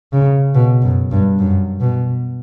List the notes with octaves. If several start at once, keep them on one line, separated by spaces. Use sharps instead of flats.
C#3
B2
F#2
G2
F#2
B2